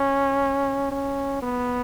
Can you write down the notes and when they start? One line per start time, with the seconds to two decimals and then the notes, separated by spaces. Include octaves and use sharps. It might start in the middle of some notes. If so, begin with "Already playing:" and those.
Already playing: C#4
0.91 C#4
1.42 B3